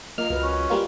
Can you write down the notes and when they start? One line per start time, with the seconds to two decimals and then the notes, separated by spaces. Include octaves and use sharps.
0.18 A#3 F4 A#4 D#5 F6
0.30 C#2 F#4 B4
0.43 C#4
0.70 G3 A#3 F4